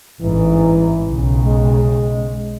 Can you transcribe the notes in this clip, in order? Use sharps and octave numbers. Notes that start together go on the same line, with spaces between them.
A1 G#2 E3
B1 C#3
G#3